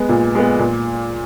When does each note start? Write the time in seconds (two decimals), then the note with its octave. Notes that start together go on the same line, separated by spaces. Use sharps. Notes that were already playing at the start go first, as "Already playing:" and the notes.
Already playing: G#3 B3
0.09 A#2
0.35 G#3 B3
0.59 A#2